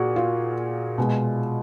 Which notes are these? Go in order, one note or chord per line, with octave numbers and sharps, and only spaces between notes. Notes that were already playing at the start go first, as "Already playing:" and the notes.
Already playing: A#2 F#4 G#4
F4
B2 G#3